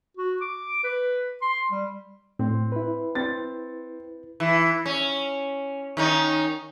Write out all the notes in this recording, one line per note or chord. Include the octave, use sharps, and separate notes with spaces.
F#4
D6
B4
C6
G3
A2 C4
E4 B4
C4 A6
E3
C#4
D#3 C#4 D#4